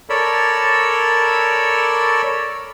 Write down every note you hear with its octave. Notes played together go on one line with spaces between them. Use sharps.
A4 A#4 C#5 D5 B5 E6